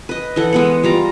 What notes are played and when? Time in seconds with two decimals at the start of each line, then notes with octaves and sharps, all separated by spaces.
0.09 B4 D#5
0.36 E3 A4 F#5
0.53 G#3 B3 F#5
0.84 G3 F4 A#5